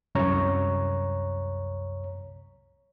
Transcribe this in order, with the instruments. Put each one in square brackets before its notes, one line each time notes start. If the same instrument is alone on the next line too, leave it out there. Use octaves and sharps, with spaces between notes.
[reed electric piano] C2 F#2 C#5 A#5